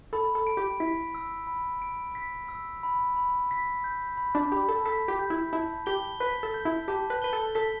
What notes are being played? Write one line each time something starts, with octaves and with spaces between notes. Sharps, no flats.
A4 B5
A4
D7
G4
E4 B6
E6
B5
D7
B6
E6
B5
B5
B6
G6
B5
D4
G4 B5
A4
A4 B6
G4
G6
E4
E4 A5
G4 G7
B4 B6
A4
G6
E4
G4 A5
B4
B4 G7
A4
A4 B6